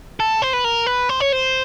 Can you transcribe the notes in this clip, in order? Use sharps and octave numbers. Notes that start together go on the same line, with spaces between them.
A4
C5
B4
A#4
B4
C5
C#5
C5